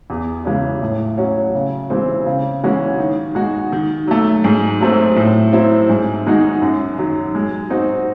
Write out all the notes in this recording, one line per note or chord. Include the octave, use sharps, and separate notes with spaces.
E2
C#3 E3 G#3 C#4
A2
F#3 C#4 F#4 C#5
C#3
E3 G#3 C4
C#3
E3 G#3 C#4 F#4
D#3
G#3 D#4 F#4
D#3
F#3 A3
G#2
F#3 A3 C4
A2
F#3 C4 E4
G#2
D#3 G#3 D#4 F#4
F#2
D#3 F#3
G#3
C4 D#4 F#4